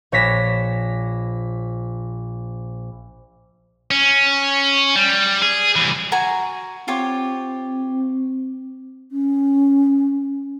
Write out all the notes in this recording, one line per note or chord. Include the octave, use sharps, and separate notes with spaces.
A#1 C#5 A#6 B6 E7
C#4
G3
G#4
C2 E3
F#4 G#5 A#5
C4 F4 G4 C#5
C#4